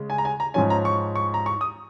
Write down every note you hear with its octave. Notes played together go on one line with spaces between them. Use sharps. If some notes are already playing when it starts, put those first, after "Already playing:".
Already playing: C#3 G#3
G#5
A#5
G#5
A#5
G#2 F3 C#4 G#5
A#5
C#6
C#6
A#5
C#6
D#6